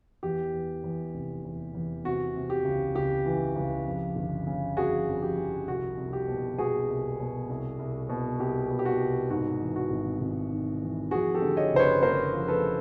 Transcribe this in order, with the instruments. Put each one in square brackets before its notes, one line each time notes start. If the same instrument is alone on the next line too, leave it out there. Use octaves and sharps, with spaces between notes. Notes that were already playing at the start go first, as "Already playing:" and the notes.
[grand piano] E2 G4
E2
E2
F1
E2
E2
C3 F#4
C3
G4
C#2
C#2 G4
E3
C#2
F2
G1
C#3
F2 F#4 G#4
F2
G4
F3
C2 F#4
C2
G4
B2
B2 F#4 G#4
C2
B2
C2
C2
B2
C2 G4
B2
G4
F#4
C2
G#2 F#4
E3
F#4
G#1
G#1
G#2
E3
F2 F#4 G#4
G4 A4
D3
C#5 D#5
F#1 C5
B4 C#5
D3 A#4 C5
F3
A4 B4